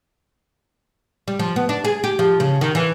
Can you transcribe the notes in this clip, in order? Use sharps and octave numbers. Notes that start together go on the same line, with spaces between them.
G3
F3
B3
D4
G#4
G4
F3
C#3
D#3
E3